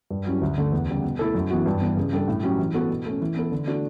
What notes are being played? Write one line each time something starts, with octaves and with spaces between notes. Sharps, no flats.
G2
F#3 C#4 E4 G4
D2
D3 A3
E2
C#3 G3
B2
A3 E4 A4
F#2
E3 B3 F#4
G2
E3 B3
C#3
G3 D4 A4
A2
F#3 C#4 G4
E3
B3 F#4 A4
B2
A3 C#4
E3
B3 E4 A4
D3
A3 D4 F#4